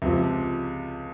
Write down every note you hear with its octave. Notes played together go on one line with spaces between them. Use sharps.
C#2 C3 F3